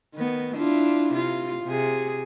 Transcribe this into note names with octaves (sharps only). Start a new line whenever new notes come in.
D#3 B3
D4 E4 F4
C3 F4
C3 G#4